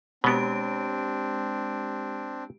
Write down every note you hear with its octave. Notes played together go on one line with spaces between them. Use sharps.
B2 G#3 B3 C4 D4 G4 D7